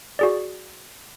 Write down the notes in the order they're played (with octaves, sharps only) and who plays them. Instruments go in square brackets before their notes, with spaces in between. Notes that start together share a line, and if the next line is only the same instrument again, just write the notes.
[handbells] F#4 G#4 D5